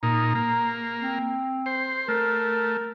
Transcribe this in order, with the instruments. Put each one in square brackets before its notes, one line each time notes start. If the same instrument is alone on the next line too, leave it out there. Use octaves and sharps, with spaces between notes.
[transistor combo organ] A#2 D#4 [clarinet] A#5
[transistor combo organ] A#3
[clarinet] C4
[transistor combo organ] C5
[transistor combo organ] A3 [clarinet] A#4